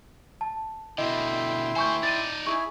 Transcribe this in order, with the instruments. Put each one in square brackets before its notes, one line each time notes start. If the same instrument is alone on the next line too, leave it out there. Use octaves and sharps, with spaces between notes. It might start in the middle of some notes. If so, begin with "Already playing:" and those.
[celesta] A5
[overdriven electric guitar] B2 D3 [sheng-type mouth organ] E4 G5 C6 [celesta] D#5
[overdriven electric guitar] D2 C5 [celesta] G#5 C#6 G6
[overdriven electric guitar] D#4 D5 [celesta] A6 D#7
[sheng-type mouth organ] E4 G#4 G#5 [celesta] C#6